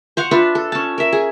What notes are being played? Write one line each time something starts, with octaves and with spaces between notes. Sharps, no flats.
C5 F5 F#5 C#6
D4 F4 B4 E5
A4
C#4 A5
A#4 E5
G#4